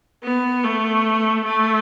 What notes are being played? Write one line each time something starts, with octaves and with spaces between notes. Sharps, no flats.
B3
A3
A3